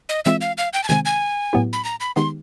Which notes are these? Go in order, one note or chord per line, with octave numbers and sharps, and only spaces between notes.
D#5
E3 G#3 C4 F4 E5
F5
F5
G5
A5
C3 D#3 G#3 C4 G#5
G#5
A2 F#3 B3 E4 G4
B5
A#5
B5
D#3 G#3 B3 D#4 G4 C6